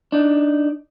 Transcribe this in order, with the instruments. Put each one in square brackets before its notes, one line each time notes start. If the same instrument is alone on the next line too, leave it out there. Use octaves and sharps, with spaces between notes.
[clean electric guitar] D4 D#4